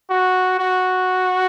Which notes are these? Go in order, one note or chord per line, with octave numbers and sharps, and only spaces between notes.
F#4
F#4